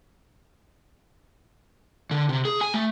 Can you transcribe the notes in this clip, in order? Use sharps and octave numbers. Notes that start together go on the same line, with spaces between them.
D3
C3
G#4
G#5
A3